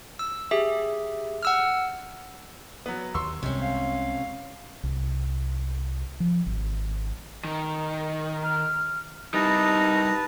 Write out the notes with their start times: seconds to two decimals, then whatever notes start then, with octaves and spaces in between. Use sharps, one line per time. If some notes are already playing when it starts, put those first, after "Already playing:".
0.19 E6
0.51 G4 G#4 E5
1.43 F#5 E6 F6
2.86 F#3 B3
3.15 D#2 C6 C#6 E6
3.43 C2 C3 G3 G#3 C#4
3.62 F5
4.83 C2
6.20 F3
6.46 G#1
7.45 D#3
8.44 F6
9.34 G3 D#4 E4 B4 A5 A#6